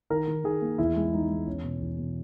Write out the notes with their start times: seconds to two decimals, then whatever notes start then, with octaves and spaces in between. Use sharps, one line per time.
0.10 D#3 A#4
0.28 D#3
0.44 D#3 G#4
0.62 A#3
0.78 E2 E4
0.96 G#3
1.13 G#3 D#4
1.30 G#3
1.47 E2 C#4
1.64 B2
1.81 E2
1.98 B2